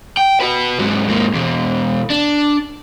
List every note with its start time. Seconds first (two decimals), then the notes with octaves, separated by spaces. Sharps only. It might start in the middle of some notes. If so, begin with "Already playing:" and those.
0.17 G5
0.40 F#4 B4
0.79 G#2 F#3
1.08 G#2 A#3
1.34 E2 B2
2.10 D4